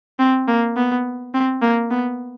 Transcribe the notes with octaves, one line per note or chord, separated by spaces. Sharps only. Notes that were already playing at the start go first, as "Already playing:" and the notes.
C4
A#3
B3
C4
A#3
B3